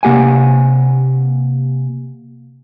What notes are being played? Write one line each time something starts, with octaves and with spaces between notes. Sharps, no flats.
C3 A#3 G4 F#5 G#5